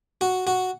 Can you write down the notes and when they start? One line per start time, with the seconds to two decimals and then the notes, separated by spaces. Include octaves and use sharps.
0.21 F#4
0.47 F#4